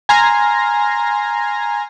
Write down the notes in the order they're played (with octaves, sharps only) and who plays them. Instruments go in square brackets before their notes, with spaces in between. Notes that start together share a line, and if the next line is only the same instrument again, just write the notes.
[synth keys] G#5 A#5 C6 F6 A#6